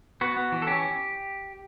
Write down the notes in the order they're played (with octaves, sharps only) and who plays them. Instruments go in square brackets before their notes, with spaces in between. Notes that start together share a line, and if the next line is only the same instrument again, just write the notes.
[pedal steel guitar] B3 F#4
B3
E3
A4
C#4 G4